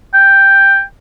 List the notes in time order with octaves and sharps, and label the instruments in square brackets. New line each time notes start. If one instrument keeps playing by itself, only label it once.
[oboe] G5